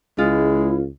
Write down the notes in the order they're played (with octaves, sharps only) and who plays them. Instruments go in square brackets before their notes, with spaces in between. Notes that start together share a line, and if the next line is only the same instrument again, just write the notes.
[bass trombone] C#2 [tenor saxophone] G#3 [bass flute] E4 [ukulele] F4